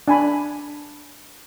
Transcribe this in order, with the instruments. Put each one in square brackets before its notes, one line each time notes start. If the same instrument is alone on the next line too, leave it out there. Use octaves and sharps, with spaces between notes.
[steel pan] D4 G#5 B5